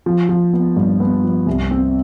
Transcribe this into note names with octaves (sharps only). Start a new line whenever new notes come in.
F3
F3
B3
G2
B3
F3
C2
C4